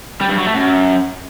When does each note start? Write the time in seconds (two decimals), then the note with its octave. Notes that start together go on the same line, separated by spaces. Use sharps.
0.21 G3
0.29 G2
0.37 F#3
0.46 A3
0.54 F#2